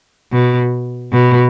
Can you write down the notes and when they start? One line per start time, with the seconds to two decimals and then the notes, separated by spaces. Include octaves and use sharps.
0.33 B2
1.12 B2